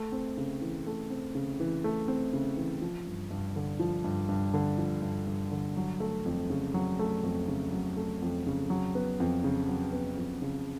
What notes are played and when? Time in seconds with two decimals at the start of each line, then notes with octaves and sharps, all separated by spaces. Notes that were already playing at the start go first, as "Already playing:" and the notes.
Already playing: A3
0.12 C4
0.37 C#3
0.61 E3
0.87 A3
1.10 C4
1.35 C#3
1.60 E3
1.84 A3
2.08 C4
2.33 C#3
2.57 E3
2.81 F3
3.07 G2
3.31 G2
3.56 D3
3.80 F3
4.04 G2
4.29 G2
4.54 D3
4.78 F3
5.02 G2
5.27 G2
5.51 D3
5.77 F#3
6.00 A3
6.26 F2
6.50 C#3
6.74 F#3
6.99 A3
7.23 F2
7.48 C#3
7.72 F#3
7.96 A3
8.22 F2
8.46 C#3
8.70 F#3
8.95 B3
9.20 F2
9.44 C#3
9.68 F#3
9.92 B3
10.17 F2
10.42 C#3